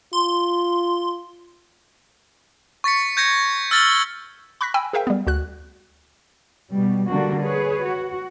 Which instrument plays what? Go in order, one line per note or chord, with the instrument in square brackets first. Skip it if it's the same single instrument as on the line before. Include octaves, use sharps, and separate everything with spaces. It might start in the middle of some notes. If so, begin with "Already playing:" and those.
[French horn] F4 [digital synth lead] C6
[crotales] C#6 A6 B6 C#7
G6 G#6 A#6 C#7
E6 F6 A6 A#6 F#7 G7
[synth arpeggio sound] B5 C#6 F#6 A#6 B6
G5 G#5 B5 E6
G#4 A#4 C5 E5 F5 G5
G3 B3
D2 F#4 F#6
[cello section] B2 G3
D3 G3 A#3 D4 F#4
G#4 B4 C#5
F#4